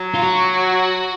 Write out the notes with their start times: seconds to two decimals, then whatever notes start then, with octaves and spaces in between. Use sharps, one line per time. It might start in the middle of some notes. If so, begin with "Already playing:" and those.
Already playing: F#3
0.14 F4
0.24 F#4